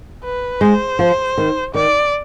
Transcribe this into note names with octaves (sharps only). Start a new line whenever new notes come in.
B4
G#3 C5
F3
D#3
D#3 D5